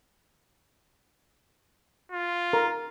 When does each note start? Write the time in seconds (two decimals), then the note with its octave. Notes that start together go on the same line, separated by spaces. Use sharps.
2.12 F4
2.53 A#4